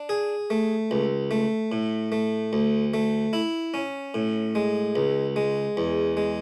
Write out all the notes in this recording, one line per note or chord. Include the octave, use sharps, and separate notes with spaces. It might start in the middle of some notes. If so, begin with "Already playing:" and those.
Already playing: D4
G#4
A3
C#2
A3
A2
A3
D2
A3
E4
C#4
A2
G#3
C#2
G#3
E2
G#3